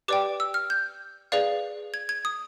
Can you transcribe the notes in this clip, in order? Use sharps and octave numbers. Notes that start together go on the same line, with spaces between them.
G4 B4 D5 G5 D6
E6
F6
G6
G#4 B4 D5 F5
G#6
G#6
D#6